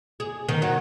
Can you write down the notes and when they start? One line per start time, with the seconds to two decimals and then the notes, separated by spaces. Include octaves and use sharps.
0.20 G#4
0.49 D#3
0.62 F#3